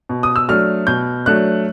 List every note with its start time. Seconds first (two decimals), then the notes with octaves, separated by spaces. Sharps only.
0.09 B2
0.23 D#6
0.36 E6
0.49 F#3 A3 D4 F6
0.87 B2 G6
1.26 F#3 A3 D4 F#6